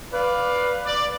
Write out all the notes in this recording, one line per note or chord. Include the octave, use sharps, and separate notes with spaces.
B4 D5 F5
D5